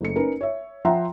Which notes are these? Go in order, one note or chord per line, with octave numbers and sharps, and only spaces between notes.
F#1 A3 C#7
C#4 D#4 A#4 B4
C#5 E5
F3 E5 F#5 G5 A#5 C6